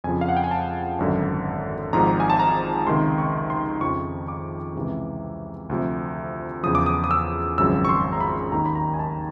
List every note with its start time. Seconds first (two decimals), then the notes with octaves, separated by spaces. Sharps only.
0.04 F2 C#3 F3 G#5
0.21 F5
0.29 F#5
0.37 G5
0.44 G#5
0.51 A5
0.99 G#1 F#2 D3
1.93 G#1 G#2 F3 A#5
2.20 G#5
2.30 A5
2.40 A#5
2.87 C#2 C3 D#3 C6
3.18 C#6
3.50 C6
3.81 F2 C#3 F3 C#6
4.28 D6
4.75 C#2 C3 E3
5.70 D2 C3 F3
6.63 E2 C#3 F3 D#6
6.75 D6
6.86 D#6
7.04 D#6
7.11 E6
7.58 G#1 F#2 C#3 F3 E6
7.85 C#6
7.89 C6
8.13 A#5
8.20 B5
8.52 D#2 D#3 A#5
8.66 B5
8.75 A#5
8.94 G#5
8.99 A5